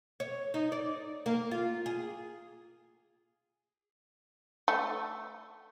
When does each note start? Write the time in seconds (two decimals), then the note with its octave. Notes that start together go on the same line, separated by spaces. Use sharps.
0.20 C#5
0.54 D#4
0.72 D5
1.26 A#3
1.51 F4
1.86 G#4
4.68 A3